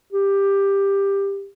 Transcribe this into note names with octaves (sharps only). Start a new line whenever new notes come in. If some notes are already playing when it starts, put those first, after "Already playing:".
G4